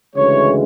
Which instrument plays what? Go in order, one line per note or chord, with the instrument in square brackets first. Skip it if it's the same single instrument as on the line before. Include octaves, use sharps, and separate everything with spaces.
[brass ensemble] D2 C#3 E3 G#3 C#5